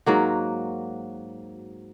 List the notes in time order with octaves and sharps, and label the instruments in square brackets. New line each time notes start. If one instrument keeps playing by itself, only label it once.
[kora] G#2 F#3 A#3 F#4